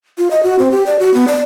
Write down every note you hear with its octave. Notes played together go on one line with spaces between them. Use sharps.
F4
D#5
F#4
C4
G4
D5
F#4
B3
D5